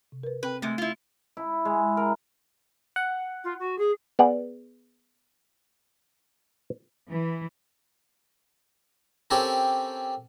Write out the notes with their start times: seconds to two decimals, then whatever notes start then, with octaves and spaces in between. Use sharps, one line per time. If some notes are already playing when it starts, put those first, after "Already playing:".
0.12 C3
0.23 A#4 B4
0.43 C4 B4 G5
0.62 C3 G#3 A3
0.78 E4 F4
1.37 E4
1.65 G#3
1.97 A#4
2.96 F#5
3.44 F4
3.59 F#4
3.78 G#4
4.19 B3 G#4 D5 F#5
7.09 E3
9.31 C4 C#4 G4 A4 A#4